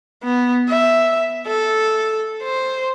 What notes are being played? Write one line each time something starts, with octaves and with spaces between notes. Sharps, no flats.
B3
E5
A4
C5